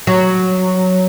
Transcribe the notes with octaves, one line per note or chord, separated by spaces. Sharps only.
F#3